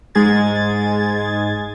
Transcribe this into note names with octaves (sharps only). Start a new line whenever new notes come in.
G#2 G#3 G#4 G#6 A6